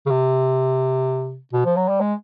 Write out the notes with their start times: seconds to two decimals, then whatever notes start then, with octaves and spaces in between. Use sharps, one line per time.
0.06 C#3
0.10 C3
1.53 B2
1.65 F3
1.76 F#3
1.88 G3
2.00 G#3